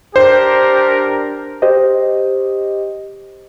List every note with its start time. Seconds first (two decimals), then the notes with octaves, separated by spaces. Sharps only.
0.16 D4 G4 A#4 C5
1.62 G4 C5 D#5